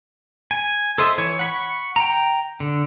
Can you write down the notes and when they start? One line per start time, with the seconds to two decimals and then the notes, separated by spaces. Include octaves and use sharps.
0.51 G#5
0.98 A4 C5 D#5 E5
1.18 E3 C#5
1.39 F#5 B5 C#6
1.96 G5 A#5
2.60 D3